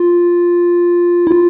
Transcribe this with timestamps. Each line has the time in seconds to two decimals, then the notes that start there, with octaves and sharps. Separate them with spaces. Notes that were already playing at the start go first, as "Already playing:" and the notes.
Already playing: F4
1.27 E4
1.31 F4